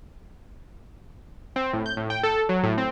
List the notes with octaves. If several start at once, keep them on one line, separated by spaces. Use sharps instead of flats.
C4
A2
G6
A2
G5
A4
F#3
A2
C4